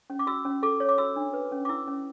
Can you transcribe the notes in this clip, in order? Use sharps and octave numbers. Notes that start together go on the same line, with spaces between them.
C#4
D6
F#4 E6
C#4
A4 D6
C#5
D6
F#4 E6
D4
B4
C#4
D6
E4 E6
C#4